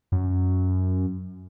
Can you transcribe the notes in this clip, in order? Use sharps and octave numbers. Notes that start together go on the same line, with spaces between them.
F#2